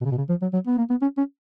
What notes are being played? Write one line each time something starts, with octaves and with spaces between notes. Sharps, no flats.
B2
C#3
B2
C#3
F3
F#3
F#3
B3
A#3
B3
C#4
C#4